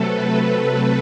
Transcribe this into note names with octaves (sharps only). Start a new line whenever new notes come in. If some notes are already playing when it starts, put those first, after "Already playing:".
Already playing: C3 F#3 A3 A4 B4
A4